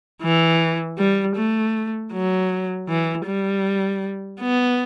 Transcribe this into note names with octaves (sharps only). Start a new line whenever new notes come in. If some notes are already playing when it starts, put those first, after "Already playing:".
E3
G3
A3
F#3
E3
G3
B3